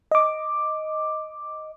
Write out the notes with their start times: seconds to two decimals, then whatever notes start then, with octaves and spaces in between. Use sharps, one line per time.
0.11 D#5 D6